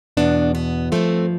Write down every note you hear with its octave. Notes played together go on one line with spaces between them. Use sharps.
E2 B2 B3 D4
B3
G2 F3 A3 C4